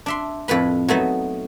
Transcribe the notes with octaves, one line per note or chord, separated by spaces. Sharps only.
D4 E5 C6
F2 A2 B4 B5
F#3 A3 B3 D#4